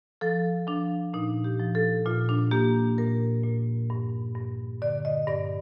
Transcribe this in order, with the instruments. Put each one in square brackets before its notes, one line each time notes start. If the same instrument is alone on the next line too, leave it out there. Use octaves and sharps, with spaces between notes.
[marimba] F3 A4
F3 D4
A#2 D#4
G4
F3
A4
A#2 F4
D4
A#3 G4
A#2 A#4
A#2
G2
G2
D3 D5
D#5
G2 D5